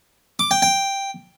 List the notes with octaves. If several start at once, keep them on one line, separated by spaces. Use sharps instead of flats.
D6
G5
G5